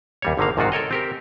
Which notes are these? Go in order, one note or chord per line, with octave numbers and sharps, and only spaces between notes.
D#2 G3 C#5
G#1 D3 D#3 A#3 F5
A#1 G#2 C3 D#3 F4 F#4
A4 A#4 C#5 D#5
C4 G4 A#4